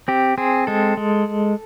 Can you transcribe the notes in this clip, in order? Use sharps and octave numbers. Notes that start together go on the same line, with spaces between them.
C4 G4
C4 G#4
G#3 A4
G#3